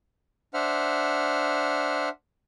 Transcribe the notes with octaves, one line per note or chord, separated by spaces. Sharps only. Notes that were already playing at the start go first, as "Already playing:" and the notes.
D4 C5 E5 F#5 F6